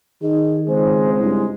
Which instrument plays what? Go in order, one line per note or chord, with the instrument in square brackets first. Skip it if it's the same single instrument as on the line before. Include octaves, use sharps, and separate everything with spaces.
[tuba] D#3 [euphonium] D#4 [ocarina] G#4
[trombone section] C#2 G#3 [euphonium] C4 [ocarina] C5
[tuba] G2 [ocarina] E4